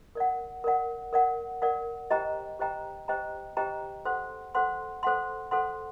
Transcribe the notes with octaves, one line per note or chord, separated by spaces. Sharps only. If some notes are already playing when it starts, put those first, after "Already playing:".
A#4 D5 F#5
A#4 D5 F#5
A#4 D5 F#5
A#4 D5 F#5
G4 C5 D#5 G5 A#5
G4 C5 D#5 G5 A#5
G4 C5 D#5 G5 A#5
G4 C5 D#5 G5 A#5
A4 C5 F#5 C6
A4 C5 F#5 C6
A4 C5 F#5 C6
A4 C5 F#5 C6